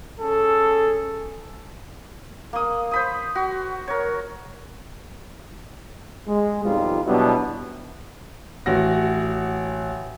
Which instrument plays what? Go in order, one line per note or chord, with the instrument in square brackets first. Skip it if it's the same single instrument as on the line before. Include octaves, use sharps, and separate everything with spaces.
[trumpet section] C#4 G#4 A4
[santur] A#3 D#6
C5 B5 D#6
F#4
A#4 C#5
[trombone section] G#3
F2 B2 F3 G3 D#4 F4
B2 F#3 G3 B3 D4 E4
[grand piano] A1 F#4 F#5 A#6